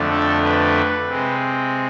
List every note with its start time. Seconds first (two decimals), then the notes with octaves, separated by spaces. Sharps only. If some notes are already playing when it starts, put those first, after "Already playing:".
Already playing: F2 D3 A3 D4
0.10 A4
0.42 B4
1.07 C3 G#3 C4